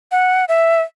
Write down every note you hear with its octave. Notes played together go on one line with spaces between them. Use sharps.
F#5
E5